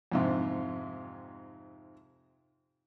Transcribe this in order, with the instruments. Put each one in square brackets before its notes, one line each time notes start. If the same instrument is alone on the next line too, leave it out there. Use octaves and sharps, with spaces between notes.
[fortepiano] F2 G#2 C3